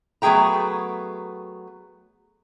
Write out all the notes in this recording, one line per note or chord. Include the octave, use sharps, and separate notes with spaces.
F#3 A3 B3 G#4 G5 A#5